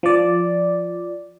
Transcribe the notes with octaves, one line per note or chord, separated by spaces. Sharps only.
F3 D5